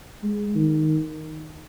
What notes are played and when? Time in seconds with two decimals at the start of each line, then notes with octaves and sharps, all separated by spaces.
0.23 G#3
0.55 D#3